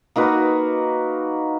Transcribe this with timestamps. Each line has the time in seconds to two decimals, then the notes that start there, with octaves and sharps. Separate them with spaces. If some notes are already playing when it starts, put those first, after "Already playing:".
0.16 A#3 D#4 F#4 B4